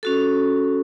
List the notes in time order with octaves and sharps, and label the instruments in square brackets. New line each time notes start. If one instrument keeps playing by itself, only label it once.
[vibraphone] C#4 F#4 A4